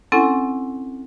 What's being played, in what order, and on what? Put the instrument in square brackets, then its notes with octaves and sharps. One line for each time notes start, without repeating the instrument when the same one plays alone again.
[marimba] C4 C#4 E4 A4 F#5 G#5